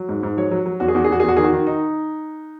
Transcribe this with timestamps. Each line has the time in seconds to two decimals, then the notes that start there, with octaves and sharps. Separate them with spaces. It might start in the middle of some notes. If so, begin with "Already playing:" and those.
Already playing: F#3
0.09 G#2
0.23 G#2
0.37 F#3 C#5
0.51 F#3
0.66 F#3
0.80 E2 F#4
0.88 G#4
0.95 E2 F#4
1.04 G#4
1.09 E2 F#4
1.20 G#4
1.23 E2
1.28 F#4
1.37 D#3 G#4
1.44 F#4
1.52 D#3
1.67 D#4